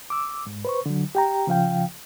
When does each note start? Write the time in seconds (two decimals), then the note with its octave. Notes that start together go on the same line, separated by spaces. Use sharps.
0.10 D6 E6
0.47 G#2
0.65 B4 C5 C#6
0.86 D3 F#3
1.15 G4 G5 A#5
1.47 C#3 F3 F5 G5